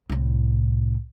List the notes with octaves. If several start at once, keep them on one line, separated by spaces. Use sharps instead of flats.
C2 A2